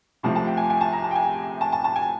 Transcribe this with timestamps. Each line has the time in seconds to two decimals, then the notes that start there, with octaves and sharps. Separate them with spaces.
0.23 C2 C3 F3 A3 A5
0.35 A5
0.47 G5
0.57 G#5
0.70 G#5
0.81 A5
0.93 A#5
1.04 A5
1.11 G5
1.15 G#5
1.61 A5
1.72 A5
1.84 A5
1.96 G#5